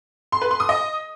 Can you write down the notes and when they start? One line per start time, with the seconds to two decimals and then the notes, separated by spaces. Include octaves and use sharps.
0.32 C6
0.42 B4
0.51 C6
0.60 D#6
0.69 D#5